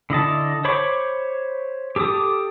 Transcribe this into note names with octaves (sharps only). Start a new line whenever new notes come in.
D3 E4 D#5 A5
C5 C#5 B5 C#6 D6
G4 A4 D6 D#6